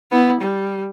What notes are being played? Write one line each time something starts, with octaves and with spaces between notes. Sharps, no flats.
B3 E4
G3